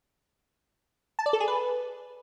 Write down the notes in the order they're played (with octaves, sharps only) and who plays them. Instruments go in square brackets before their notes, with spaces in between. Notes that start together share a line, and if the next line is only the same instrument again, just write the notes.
[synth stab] A5
D5
A4
G#4
B4